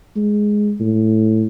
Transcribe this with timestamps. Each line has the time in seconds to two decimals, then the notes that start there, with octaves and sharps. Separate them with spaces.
0.16 G#3
0.80 A2